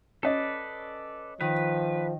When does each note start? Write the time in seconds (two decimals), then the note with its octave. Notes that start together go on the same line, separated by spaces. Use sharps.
0.23 C#4 A4 B4 D5 D#5
1.41 D#3 F3 B4